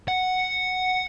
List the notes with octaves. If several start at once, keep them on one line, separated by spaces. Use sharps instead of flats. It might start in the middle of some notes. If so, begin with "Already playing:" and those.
F#5